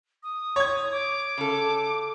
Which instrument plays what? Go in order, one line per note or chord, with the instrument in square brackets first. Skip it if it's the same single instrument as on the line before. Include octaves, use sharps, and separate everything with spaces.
[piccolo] D#6
[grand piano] C#5 G#6
[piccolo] D6
[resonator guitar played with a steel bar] C#3 A4